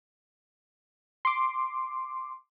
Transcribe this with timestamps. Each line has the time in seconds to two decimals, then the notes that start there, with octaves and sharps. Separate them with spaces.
1.25 C6 D6